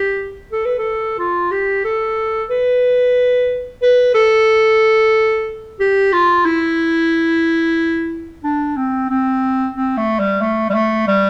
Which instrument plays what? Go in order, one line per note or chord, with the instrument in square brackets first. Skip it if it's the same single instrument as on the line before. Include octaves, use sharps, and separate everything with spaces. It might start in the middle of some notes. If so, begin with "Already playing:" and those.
Already playing: [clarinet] G4
A4
B4
A4
F4
G4
A4
B4
B4
A4
G4
F4
E4
D4
C4
C4
C4
A3
G3
A3
G3
A3
G3